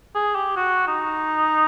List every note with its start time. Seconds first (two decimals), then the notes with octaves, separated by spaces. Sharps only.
0.15 G#4
0.35 G4
0.56 F#4
0.87 D#4